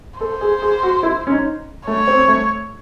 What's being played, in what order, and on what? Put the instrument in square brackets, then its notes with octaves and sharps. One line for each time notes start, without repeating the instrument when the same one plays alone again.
[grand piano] A4 [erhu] C5
[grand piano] G#4
G#4
F#4
E4
C#4
D#4
[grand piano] A3 [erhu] C#5
[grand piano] C4
C4
A3